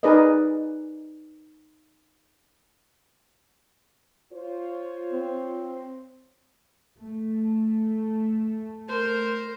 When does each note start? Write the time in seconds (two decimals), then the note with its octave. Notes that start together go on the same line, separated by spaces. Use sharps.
0.03 D#4 G#4 A#4 B4 D5 D#5
4.33 F4 C5 C#5
5.13 C4
7.02 A3
8.88 A#4 C5